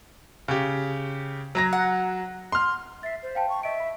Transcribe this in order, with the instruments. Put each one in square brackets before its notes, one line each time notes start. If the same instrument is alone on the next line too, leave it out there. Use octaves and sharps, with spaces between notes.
[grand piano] C#3 G4
F#3 A#5 A#6
[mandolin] F#5
[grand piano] C6 F6
[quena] E5 [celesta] A6 C7
[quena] C5
[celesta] F5 G5 A5
[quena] C#6
[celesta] D#5 D7 [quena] E5
[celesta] B5